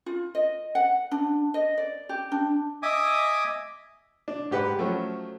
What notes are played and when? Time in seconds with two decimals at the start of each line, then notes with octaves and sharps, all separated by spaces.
0.06 F4
0.35 D#5
0.75 F#5
1.11 D4
1.54 D#5
1.78 D5
2.09 G4
2.32 D4
2.83 D#5 E5 G#5 D6 D#6
4.28 D4
4.51 G#2 G4 B4 F#5 B5
4.79 F3 F#3 A3 C#4